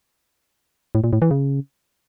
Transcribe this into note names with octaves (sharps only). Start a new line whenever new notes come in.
A2
A#2
A2
E3
C#3